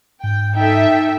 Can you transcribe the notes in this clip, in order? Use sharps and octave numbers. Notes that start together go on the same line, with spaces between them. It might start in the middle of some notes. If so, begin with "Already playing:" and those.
G#2 G5
D#4 A4 E5 G5